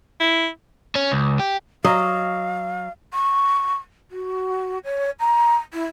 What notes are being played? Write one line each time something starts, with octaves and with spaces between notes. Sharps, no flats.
E4
C#4
C#2
G4
F#3 D#5 F5
C#6
F#4
C#5
A#5
E4